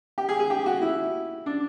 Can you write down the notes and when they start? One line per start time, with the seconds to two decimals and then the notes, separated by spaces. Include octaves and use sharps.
0.18 G4
0.29 G#4
0.39 G#4
0.50 G4
0.66 F#4
0.81 E4
1.46 D4